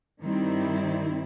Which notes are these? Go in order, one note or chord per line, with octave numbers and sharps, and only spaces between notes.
G2 D#3 G3 C4 E4